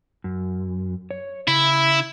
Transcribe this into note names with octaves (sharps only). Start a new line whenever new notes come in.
F#2
C#5
C#3 E4